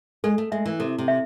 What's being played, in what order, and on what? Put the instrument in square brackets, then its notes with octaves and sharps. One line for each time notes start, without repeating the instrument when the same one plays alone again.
[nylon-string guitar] G#3 [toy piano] A4
[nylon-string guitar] A3
[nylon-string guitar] G#3 [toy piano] E5
[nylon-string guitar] E3
[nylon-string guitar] C3 [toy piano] A4
[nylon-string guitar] C3
[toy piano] E5